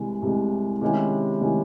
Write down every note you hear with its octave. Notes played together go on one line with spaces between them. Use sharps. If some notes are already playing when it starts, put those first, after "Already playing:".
Already playing: C2 C3 E3 G#3
C2 C3 E3 G#3
C3 D#3 G#3 C#4 E4
C3 D#3 G#3 C#4 E4